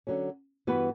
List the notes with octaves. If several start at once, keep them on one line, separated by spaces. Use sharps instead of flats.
D3 F#3 C#4
G2 E3 B3 F#4 B4